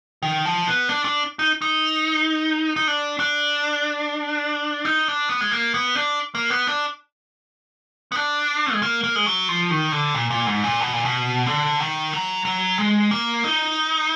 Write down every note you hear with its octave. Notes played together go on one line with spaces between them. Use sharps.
D#3
F3
B3
D4
D4
D#4
D#4
D#4
D4
D4
D#4
D4
B3
G#3
A#3
B3
D4
A#3
B3
D4
B3
D4
G#3
A#3
A#3
G#3
F#3
F3
D#3
D3
A#2
A#2
G#2
A#2
B2
A#2
B2
D3
D#3
F#3
F#3
G#3
A#3
D#4